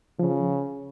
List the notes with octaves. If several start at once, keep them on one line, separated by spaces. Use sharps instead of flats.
C#3 F3